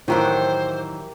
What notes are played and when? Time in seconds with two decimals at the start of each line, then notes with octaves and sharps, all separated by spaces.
0.08 A2 D#3 E3 F#3 A#3 E4 G4 C5